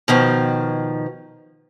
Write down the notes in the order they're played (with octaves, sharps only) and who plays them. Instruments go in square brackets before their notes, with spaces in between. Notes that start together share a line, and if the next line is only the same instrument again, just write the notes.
[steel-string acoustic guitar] B2 D#3 F3